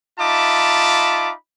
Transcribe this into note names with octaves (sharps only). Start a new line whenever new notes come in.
D#4 F4 E5 A5 B5 D6